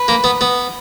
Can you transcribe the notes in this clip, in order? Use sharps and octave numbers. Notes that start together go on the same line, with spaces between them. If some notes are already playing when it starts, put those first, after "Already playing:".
Already playing: B4
A#3
B3
B3